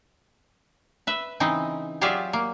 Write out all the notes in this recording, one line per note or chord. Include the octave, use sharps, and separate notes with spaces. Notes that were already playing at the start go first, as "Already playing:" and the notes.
B4 E5
C#3 E3 C4 D#4
F#3 F4 G4 G#4 D5 E5
A#3